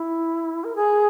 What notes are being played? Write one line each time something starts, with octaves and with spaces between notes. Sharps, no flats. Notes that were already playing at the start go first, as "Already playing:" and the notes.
Already playing: E4
A#4
G#4